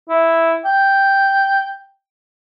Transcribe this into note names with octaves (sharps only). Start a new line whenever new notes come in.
E4
G5